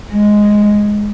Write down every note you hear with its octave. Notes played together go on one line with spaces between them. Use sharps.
G#3